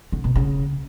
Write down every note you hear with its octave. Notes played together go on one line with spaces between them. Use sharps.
D3
B2
C#3